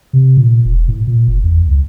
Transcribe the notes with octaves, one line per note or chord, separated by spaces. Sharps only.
C3
A#2
E1
A2
A#2
F#1
E2
C#2